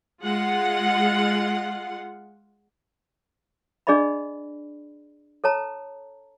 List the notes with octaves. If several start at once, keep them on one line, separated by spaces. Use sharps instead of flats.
G#3 F4 F#5
D4 G#4 D5 D#5 B5
A4 C#5 A5 A#5